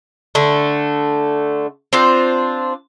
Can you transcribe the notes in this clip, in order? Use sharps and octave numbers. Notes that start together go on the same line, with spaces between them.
D3 A3
C4 D4 F4 C5